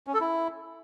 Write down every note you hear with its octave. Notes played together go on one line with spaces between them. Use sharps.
C#4
A4
E4